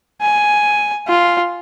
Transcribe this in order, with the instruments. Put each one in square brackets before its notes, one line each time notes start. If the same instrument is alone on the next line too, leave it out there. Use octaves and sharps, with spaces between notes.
[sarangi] G#5
F4